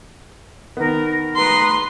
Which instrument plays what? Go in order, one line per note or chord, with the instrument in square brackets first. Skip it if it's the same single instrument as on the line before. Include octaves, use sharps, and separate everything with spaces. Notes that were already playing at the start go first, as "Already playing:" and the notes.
[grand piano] D#3 B3 [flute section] A#4
[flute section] B4 A#5 D#6 [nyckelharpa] C6